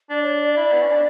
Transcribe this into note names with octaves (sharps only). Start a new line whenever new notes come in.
D4 D5
C#5
D5
E4
B3
C#4
D4